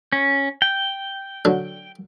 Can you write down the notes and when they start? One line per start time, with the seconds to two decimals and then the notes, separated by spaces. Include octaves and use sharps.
0.12 C#4
0.62 G5
1.45 D3 F#3